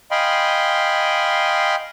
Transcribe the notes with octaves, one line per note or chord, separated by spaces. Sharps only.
D#5 F5 G5 G#5 B5 C6